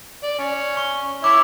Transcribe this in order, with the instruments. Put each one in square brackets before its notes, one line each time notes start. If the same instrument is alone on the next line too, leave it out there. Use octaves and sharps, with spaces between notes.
[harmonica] D5
C#4
[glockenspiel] C#6
[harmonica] E4 C#5 E5 [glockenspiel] D6